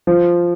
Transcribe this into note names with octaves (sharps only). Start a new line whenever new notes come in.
F3